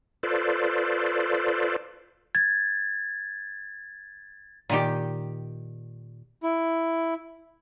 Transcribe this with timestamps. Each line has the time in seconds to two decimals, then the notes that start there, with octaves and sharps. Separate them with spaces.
0.23 F4 A4 B4 C5 D5
2.35 G#6 A6
4.70 A#2 D#3 G4
6.43 E4